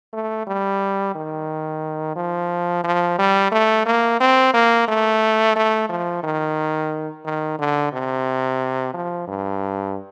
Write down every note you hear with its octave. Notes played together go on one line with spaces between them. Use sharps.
A3
G3
D#3
F3
F3
G3
A3
A#3
C4
A#3
A3
A3
F3
D#3
D#3
D3
C3
F3
G2